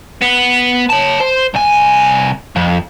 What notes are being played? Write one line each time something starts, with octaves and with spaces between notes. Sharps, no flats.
B3
C#5 A5
C5
C2 G#5
F2